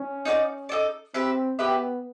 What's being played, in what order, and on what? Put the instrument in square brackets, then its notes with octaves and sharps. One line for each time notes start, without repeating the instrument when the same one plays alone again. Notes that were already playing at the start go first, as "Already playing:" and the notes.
Already playing: [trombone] C#4
[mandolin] D#4 F#4 A4 D5
D#4 F#4 A4 D5
[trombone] C4 [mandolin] G4 B4 E5
[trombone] B3 [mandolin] G4 B4 E5